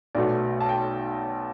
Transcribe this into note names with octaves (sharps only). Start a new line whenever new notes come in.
B1 B2 A3 D5
A5
G5